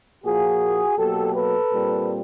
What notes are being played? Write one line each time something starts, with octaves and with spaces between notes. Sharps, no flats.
A#2 F3 A#3 F#4 G#4
B2 F#3 A#3 G4 A4
A4 B4
A#2 G3 C4